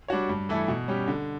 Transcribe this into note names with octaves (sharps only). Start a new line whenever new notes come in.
G3 D4 F#4 C#5
G2
E3 A3 E4 A4
B2
G3 C#4 G4
D3